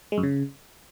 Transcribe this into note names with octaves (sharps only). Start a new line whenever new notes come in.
G#3
F#2
C#3